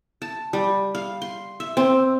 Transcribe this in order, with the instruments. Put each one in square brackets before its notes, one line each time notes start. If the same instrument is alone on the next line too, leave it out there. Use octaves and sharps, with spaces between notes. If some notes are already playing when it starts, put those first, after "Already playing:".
[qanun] A5
G3
F5
C6
E5
C4